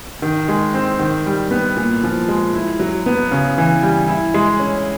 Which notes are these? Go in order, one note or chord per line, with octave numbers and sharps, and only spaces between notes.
D#3
G#3
C4
D#3
G3
B3
A#2
F3
G#3
E4
F#3
B3
C#3
E3
G3
E4
G#3
C#4